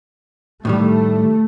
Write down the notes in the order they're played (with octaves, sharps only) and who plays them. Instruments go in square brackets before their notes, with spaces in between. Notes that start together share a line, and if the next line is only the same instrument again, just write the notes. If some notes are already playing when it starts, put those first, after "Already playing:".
[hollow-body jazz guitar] A2 D#3 G3 [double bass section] A3